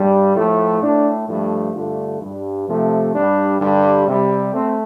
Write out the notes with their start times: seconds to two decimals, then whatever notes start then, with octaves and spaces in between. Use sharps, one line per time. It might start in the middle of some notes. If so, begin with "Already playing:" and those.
Already playing: G2 G3
0.35 A2 F3 A3
0.82 A2 A3 D4
1.28 G2 F3 A3
1.74 G2 D3 A3 F4
2.22 G2 G3
2.68 C3 F3 A3
3.14 G2 G3 D4
3.61 G2 D3 G3
4.08 C3 G3
4.53 A3 C4